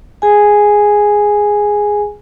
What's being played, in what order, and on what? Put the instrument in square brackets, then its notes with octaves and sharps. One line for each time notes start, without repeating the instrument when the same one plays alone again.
[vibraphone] G#4 G#5